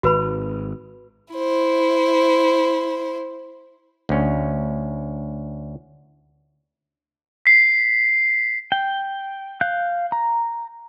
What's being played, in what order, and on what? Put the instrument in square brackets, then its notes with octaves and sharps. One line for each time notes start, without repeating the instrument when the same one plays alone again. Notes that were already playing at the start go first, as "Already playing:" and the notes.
[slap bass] G#1 [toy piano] F#4 B4 B5
[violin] E4 C5
[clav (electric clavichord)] D2 C#4
[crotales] B6 C7
[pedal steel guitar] G5
F5 F#6 G6
A#5